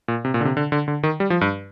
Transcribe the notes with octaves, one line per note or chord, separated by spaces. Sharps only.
A#2
C3
A#2
D3
C3
D3
D3
D3
D#3
G3
F3
G2